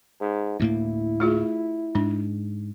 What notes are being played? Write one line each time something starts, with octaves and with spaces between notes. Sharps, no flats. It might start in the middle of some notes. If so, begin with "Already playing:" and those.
G#2
D2 A2 A#3 E4
A3 F4 G#4
G#2 D4